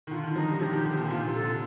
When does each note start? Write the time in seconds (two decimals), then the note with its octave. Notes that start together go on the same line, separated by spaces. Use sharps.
0.07 D#3
0.11 D3 F4
0.24 D#3
0.35 F3 D#4
0.49 G3
0.60 F3 G4 A4
0.73 D#3
0.85 D3
0.93 C3
0.97 A#2
1.10 A#2 F4
1.26 C3
1.35 A4
1.42 D3